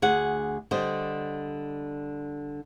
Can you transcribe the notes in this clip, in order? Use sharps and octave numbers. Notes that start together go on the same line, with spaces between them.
D2 G#4 F#5
D3 G3 C5 D#5